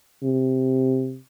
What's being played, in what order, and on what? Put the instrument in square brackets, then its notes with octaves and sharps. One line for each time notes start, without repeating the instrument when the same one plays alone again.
[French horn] C3